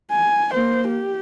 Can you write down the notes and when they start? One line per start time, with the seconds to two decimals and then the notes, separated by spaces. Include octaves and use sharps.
0.11 G#5
0.53 A#3 C5
0.88 G4